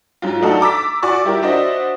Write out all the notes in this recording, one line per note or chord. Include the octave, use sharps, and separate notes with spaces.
G#2 F#3 F4
A3 D4 D#4 F#4 A4
A#5 D6 E6 A6 B6
F#4 D5 G#5 C#6
G3 E4 G4 A#4
D4 F#4 C5 D#5 E5